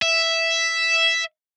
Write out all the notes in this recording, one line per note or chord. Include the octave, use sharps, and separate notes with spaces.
E5